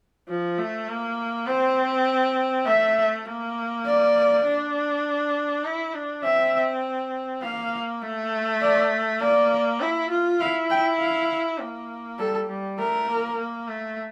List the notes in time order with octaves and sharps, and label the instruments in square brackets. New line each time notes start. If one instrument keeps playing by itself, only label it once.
[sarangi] F3
A3
A#3
[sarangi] C4 [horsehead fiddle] C5
[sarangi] A3 [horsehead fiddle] E5
[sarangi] A#3
[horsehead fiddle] D5
[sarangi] D4
E4
D4
[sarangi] C4 [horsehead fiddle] E5
[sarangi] A#3 [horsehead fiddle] F5
[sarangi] A3
[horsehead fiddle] D5
[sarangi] A#3 [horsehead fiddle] D5
[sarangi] E4
F4
[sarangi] E4 [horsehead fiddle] F5
[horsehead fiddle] G5
F5
[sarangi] A#3
[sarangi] G3 [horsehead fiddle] A4
[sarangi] G3
[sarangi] A3 [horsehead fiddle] A#4
[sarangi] A#3
A#3
A3